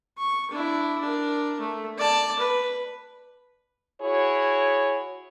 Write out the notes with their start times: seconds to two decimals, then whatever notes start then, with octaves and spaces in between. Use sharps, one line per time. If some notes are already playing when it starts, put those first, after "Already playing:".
0.18 C#6
0.51 D4 E4
1.01 D4 A#4
1.61 A3
1.98 D5 A5
2.39 B4
4.02 E4 F#4 G#4 C#5